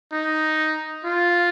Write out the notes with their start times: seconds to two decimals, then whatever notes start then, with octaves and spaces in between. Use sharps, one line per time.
0.12 D#4
1.04 F4